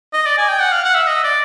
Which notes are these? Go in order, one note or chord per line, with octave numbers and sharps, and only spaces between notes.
D#5
D5
G#5
G5
F#5
F5
F#5
E5
D#5
D5